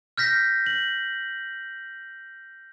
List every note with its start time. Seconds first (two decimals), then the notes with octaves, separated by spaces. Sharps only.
0.18 F6 G6 A#6 B6
0.66 F#7